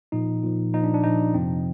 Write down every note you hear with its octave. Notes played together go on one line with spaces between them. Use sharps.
A#2 F3 D#4
A#2 F3
A#2 F3 D#4
D4
D4
A#2 F3 D#4
F2 C3 F3 C4